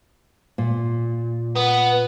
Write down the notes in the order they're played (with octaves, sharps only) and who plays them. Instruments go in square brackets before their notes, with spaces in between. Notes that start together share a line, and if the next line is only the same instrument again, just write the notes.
[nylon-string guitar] A#2
[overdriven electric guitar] B3